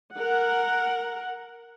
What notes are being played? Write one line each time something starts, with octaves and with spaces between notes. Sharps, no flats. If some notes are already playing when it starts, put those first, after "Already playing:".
A#4 F#5